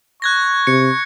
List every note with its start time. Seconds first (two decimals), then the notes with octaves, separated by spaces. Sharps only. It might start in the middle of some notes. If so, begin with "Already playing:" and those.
0.22 C#6 F#6 G#6 A#6
0.67 C3 C#7